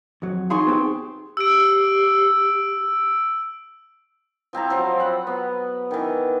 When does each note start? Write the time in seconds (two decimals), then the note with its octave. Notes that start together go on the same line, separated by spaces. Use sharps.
0.22 F2 F#3
0.50 D#4 G#4 C6 C#6
0.67 B3 C4 G4
1.37 G4 E6 D7
4.53 F3 C4 E4 A#5
4.70 F3 F#3 C4
5.00 F#5 B5
5.27 B3
5.91 D#3 E3